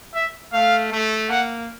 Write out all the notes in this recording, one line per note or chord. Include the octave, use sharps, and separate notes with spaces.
E5
A3 F5
A3
A#3 F#5